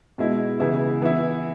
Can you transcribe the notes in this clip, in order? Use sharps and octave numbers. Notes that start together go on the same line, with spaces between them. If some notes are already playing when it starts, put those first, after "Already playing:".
B2 G#3 E4
C#3 E3 B3 E4
E3 B3 E4